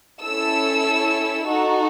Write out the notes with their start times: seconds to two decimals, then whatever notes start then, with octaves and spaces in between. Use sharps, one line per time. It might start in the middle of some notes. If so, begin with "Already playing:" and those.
0.22 C#4 E4 A4 E6
1.46 D#4 F#4 A4